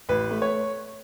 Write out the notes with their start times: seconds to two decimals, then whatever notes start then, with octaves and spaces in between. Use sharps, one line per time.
0.09 A1 B4
0.31 A3
0.42 C#5